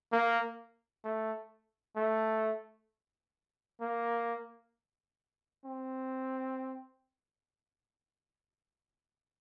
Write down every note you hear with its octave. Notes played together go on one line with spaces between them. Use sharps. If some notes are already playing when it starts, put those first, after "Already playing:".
A#3
A3
A3
A#3
C4